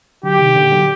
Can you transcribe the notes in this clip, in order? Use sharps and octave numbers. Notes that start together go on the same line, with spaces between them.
D3 F#3 G4
C3 D#3
A#2 D3
D3 F#3